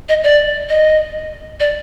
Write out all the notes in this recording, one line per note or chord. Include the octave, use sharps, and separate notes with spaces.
D#5
D5
D#5
D5